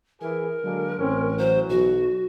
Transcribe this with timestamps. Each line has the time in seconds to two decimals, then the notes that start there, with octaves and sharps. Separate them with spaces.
0.21 E3 G#4 A#4
0.64 D3 F#3 G#3 A#3
0.99 A1 C4 C#4
1.38 E3 F#3 C5
1.69 B1 F#4